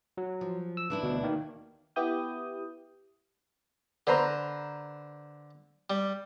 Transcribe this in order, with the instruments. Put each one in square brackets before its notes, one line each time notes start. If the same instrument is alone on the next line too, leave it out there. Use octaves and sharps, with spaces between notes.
[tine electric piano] F#3
[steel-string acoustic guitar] F3
[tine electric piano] E6
[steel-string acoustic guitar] E3 D4 E4
[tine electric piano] D2 B2
D#3 A#3
[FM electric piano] B3 E4 G4 D#6 G6
[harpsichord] D3 [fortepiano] B4 C5 A#5
[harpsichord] G3